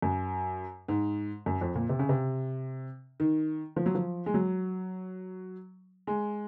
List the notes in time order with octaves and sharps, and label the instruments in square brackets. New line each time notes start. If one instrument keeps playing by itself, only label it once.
[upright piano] F#2
G#2
F#2
F2
A#2
C3
C#3
C3
D#3
F3
F#3
F3
G#3
F#3
G#3